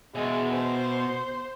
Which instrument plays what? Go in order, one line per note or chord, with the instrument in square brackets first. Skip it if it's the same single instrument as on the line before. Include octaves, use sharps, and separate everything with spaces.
[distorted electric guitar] B2 E5 [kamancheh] G#3
[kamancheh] C5